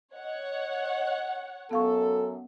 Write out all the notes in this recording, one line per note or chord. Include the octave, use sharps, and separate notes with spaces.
C#5 D#5 F#5
F#2 B3 A4 F5 C#6